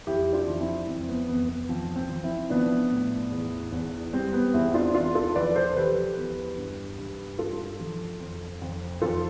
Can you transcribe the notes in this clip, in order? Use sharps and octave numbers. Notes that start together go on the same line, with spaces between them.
F2 E4 G4
D4 F4
F3
C4 E4
F2 C4
B3
F2 B3
B3
F3 C4
C4
F3
C4 E4
F3 B3 D4
A2
E2
E2
G3 C4
B3
E2 C4 E4
D4 F4
E2 D4 F4
F4 A4
F3 B4 D5
A4 C5
F3 G4 B4
E2
G2
G2
G2 F4 A4
F3
F2
F2
F2 F4 A4